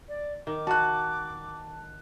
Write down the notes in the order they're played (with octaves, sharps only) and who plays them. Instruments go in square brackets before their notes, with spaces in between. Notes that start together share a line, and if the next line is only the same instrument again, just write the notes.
[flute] D5
[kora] D#3 [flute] D6
[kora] F#4 [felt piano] A5 F#6